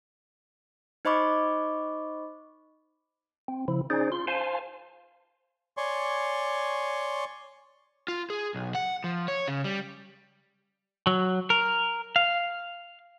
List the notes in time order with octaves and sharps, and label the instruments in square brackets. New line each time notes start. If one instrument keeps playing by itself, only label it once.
[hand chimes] D#4 C5 D#5 B5 C#6 D6
[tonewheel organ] C4
C#3 F3 E4
C#4 D#4 G#4 C5 D5
F4 C6
C5 F5 G#5 A5 C6
[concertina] C#5 D5 G#5 C6 C#6
[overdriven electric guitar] F4
G#4
B1
F#5
F3
C#5
C#3
G3
[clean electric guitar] F#3
A#4
F5